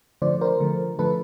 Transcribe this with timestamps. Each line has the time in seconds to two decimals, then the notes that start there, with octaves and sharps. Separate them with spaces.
0.22 D3 F3 A3 C5 D5
0.41 A#4 C5
0.60 D3 F3 A3
0.99 D3 F3 A3 A4 B4